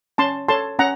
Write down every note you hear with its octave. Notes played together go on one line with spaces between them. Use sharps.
C#4 A5 C6
A4 C#5 A5 C6
C#4 F#5 A#5